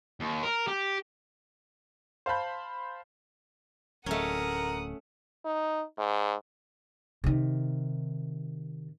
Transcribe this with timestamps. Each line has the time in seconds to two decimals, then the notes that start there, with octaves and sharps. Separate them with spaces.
0.20 D#2
0.43 A#4
0.68 G4
2.26 C5 F5 A5 B5 G6
4.06 D1 A3 C#4 A#4 F#5 D#6
5.45 D#4
5.98 G#2
7.24 C3 D#3